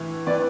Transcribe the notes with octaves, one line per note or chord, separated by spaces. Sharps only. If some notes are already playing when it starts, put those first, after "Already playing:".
Already playing: A2 E3
E3 B4 D5